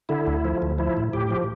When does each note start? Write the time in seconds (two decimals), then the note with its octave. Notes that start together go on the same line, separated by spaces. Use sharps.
0.09 D3 E4
0.27 D2
0.45 F3
0.62 D2
0.79 F3 E4
0.97 A2
1.13 A2 G4
1.31 F3